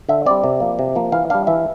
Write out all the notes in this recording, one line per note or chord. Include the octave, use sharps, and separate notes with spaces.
D3 E5
G3 C4 D5
C3
F3 A#3
C3
F3 A#3
E3 F5
G3 D4 F5
E3 E5